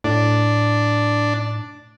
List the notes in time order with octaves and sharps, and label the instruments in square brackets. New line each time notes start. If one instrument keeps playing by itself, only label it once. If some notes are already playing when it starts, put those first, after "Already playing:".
[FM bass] A2 [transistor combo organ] D4